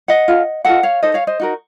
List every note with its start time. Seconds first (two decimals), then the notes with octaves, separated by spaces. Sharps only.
0.08 D#5 F#5
0.28 F4 A4
0.65 F4 A4 D#5 F#5
0.83 C#5 F5
1.03 D#4 A4 C5 D#5
1.14 C#5 F5
1.27 C5 D#5
1.40 D#4 F#4 A#4